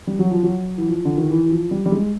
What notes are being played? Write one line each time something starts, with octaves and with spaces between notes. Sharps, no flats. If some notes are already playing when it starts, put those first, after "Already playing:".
G3
F#3
F3
F#3
E3
F3
D3
D#3
E3
E3
F3
G3
G3
G#3